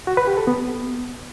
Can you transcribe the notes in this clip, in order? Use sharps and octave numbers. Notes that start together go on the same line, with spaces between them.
F#4
B4
G4
A4
B3